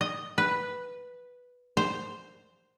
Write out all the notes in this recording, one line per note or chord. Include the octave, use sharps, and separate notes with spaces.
D#5
B4
C5